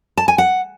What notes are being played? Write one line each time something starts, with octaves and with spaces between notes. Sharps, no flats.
A5
G#5
F#5